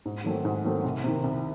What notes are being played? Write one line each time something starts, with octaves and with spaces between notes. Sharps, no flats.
G#2
D#3 F#3 A3 C4
G#2
D#3 F#3 A3 C4
C2
C3 D#3
C2